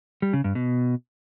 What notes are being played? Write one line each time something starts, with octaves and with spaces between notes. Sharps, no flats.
G3
C#3
G2
B2